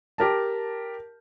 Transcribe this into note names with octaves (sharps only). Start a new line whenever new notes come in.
G4 A#4 A5